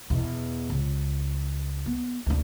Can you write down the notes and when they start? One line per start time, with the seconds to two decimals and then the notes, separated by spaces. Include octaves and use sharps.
0.10 E2 B2
0.70 C#2
1.86 B3
2.26 D2 D4